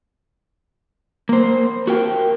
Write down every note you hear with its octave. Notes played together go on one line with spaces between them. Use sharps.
A#3 C5
F#4 A#4 G5